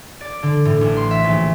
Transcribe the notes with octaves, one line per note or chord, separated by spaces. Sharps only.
D5
D3
A2
A1
C6
E5
A#1